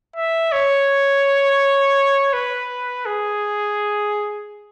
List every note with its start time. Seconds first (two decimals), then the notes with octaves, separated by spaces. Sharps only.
0.16 E5
0.52 C#5
2.33 B4
3.06 G#4